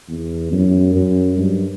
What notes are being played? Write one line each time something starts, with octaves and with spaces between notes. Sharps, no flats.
E2
F#2
F#2
G2